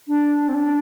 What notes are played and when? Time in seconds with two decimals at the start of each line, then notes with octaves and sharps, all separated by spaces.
0.08 D4
0.48 C4
0.54 D4